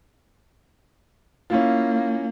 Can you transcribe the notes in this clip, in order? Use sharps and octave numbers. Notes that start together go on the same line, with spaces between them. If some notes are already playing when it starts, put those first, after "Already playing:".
A#3 C#4 E4 F4